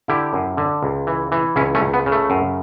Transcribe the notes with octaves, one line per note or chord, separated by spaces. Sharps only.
D3 E4 G4
F#2
D3
C#2
E3
E3
C#2 C#4 E4
A3 C#4
C#2
B3
C#3
A3
F#2